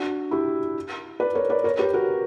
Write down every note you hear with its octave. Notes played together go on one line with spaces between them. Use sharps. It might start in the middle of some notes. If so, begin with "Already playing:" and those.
Already playing: D4 F#4
E4 G4
B4 D5
A#4 C#5
B4 D5
A#4 C#5
G4 B4
F#4 A#4